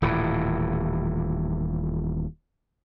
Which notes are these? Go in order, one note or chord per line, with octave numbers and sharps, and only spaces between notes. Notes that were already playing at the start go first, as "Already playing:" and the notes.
D#1 A2 E3